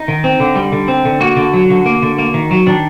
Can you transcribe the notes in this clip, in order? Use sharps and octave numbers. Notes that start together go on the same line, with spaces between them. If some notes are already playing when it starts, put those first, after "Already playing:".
Already playing: D#4
D#3
C4
D3
G3
D3
C4
D3
A#3 F#4
D3
F#3
D3
A#3
D3
A#3
D#3
F#3
D#3 D4